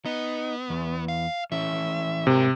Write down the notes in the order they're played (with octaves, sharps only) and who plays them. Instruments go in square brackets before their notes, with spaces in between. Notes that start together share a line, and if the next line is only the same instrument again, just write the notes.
[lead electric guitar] B3 [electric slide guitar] D#4
[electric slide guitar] E2
[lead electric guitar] F5
[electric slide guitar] E3 C#4 [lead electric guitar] E5
[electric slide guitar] G#2 A#4 [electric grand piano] C3